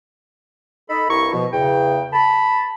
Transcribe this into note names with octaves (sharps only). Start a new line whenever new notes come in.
D#4 A4 B5
C2 G2 E4 A#5 C#6
B2 F3
E2 C#3 G5
A5 B5